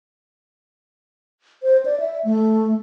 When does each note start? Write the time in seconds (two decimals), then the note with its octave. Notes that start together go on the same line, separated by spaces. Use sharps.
1.63 C5
1.85 D5
2.00 E5
2.25 A3